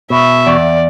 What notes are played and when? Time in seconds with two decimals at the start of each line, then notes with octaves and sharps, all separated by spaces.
0.10 B2 E5
0.46 E2 D5